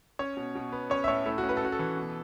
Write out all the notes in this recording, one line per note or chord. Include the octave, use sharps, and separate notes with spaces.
C#4 C#5
B2
B2
B3
C#4 C#5
E5
A2 C#5
A3 E4
F#4
C#4
B4
A4
C#4 F#4
A4
E3
B2